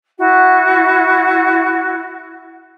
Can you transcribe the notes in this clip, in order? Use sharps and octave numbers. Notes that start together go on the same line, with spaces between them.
E4 F#4